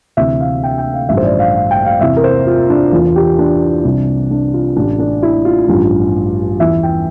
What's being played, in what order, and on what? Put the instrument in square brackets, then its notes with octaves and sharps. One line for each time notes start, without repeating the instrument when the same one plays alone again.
[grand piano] D2 C3 E3 E5
F5
G5
G5
F5
A1 G2 F3 E5
C5
D5
F5
F5
G5
F5
E2 C3 E3 E5
A#4
C5
F4
D4
E2 E3 F4
G4
D4
C2 C3 E3
D4
F4
A1 A2 E3 D4
D4
E4
F4
A1 G2 F3
E2 E3 E5
G5